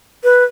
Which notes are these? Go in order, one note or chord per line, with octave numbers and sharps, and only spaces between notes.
B4